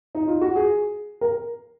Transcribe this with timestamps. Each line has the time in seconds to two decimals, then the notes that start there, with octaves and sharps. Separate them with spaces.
0.15 D#4
0.27 F4
0.41 F#4
0.56 G#4
1.21 A#4